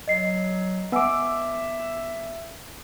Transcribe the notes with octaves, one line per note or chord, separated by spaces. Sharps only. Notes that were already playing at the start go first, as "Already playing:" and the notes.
F#3 D#5 C7
B3 E5 F#5 G#5 D6 E6